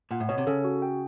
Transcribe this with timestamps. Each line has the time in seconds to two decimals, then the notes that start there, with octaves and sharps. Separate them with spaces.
0.11 A#2 F#5
0.20 A2
0.29 B2 C#5
0.38 C3
0.47 C#3 A4
0.64 F#4
0.82 G5